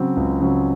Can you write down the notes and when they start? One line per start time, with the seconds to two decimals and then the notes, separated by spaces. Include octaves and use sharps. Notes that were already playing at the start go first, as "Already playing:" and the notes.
Already playing: C#3 F#3 C4
0.17 C#2
0.40 C#3 F#3 C4